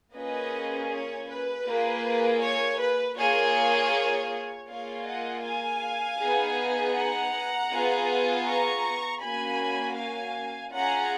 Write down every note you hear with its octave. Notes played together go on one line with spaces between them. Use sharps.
A#3 C#4 F4 G#4 B4 D#5
C#5
B4
A#3 F4 G#4
C#5
B4
A#3 F4 G#4 C#5
A#3 F4 G#4 C#5 F5
D#5 F#5
F5 G#5
B3 D#4 G#4
F#5 A#5
B3 F4 G#4
A#5 C#6
A#3 C#4 F#4 G#5 B5
F5 G#5
C#4 F4 G#4 F#5 A#5